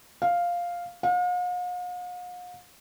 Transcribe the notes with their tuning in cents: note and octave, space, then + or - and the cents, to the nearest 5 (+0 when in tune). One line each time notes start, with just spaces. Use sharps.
F5 +0
F5 +45